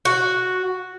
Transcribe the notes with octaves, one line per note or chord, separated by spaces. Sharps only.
F#4